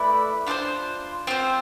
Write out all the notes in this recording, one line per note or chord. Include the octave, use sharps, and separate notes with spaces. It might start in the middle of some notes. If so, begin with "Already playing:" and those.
Already playing: A3 E4 B4 D5
D4 F4 A4 C5
C4 F4 C5